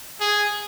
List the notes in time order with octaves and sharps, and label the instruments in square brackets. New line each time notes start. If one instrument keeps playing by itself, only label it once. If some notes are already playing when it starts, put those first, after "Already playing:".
[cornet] G#4